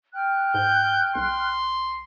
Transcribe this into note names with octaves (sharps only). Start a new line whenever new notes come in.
G5 F6 F#6
G#2 G6
B1 C6